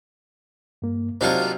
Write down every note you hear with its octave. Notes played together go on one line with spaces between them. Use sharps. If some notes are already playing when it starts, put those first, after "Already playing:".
G2 A#3
C3 F#3 D4 D#4 F4 A#4 C5